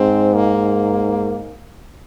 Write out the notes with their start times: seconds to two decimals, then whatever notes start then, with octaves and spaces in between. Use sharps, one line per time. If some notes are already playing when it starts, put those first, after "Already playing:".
Already playing: G#2 C4
0.35 A#3